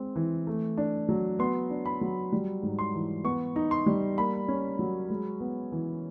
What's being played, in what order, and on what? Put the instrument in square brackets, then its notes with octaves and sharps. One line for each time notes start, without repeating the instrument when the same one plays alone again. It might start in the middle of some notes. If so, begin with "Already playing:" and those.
Already playing: [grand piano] G#3 C4
E3
A3
D4
F#3
B3 C6
D4
B5
F#3
G3
G#2
C6
E3
B3 C#6
D#4
C6
G3
A#3 B5
C#4
F#3
G#3
B3
E3